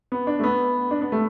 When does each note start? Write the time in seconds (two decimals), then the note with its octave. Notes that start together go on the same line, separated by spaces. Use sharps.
0.12 B3
0.27 D4
0.40 A3
0.44 B3
0.91 D4
1.01 B3
1.12 A3